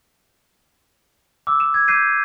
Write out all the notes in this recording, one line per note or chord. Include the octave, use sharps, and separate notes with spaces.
D6 E6
E7
G#6
D6 G6 B6 C7 D#7